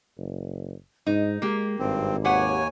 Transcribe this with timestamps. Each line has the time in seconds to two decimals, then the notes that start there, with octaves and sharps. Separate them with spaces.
0.17 F#1
1.07 G#2 D#4
1.42 G#3 A#3 G4
1.79 G#1 G2 C4
2.24 D#2 G4 B4 C#5 F#5 G#5